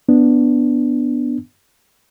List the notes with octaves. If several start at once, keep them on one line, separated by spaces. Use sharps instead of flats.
B3 D4